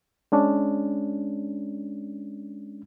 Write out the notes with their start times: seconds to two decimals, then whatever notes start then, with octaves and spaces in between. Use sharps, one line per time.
0.32 G#3 C#4 D4